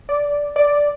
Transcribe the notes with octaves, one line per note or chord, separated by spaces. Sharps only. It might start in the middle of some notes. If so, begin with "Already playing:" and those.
D5
D5